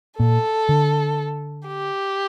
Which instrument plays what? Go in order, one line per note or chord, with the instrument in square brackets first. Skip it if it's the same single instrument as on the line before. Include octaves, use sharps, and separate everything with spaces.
[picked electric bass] A#2 [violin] A4
[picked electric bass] D3
[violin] G4